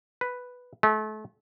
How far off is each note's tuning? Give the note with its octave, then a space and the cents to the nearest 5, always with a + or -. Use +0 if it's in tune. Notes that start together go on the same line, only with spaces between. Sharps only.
B4 +0
A3 -35